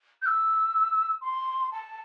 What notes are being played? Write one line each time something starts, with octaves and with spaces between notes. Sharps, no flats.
G6
E6
C6
A5